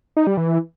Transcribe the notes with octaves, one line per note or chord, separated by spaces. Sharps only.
D#4
G3
E3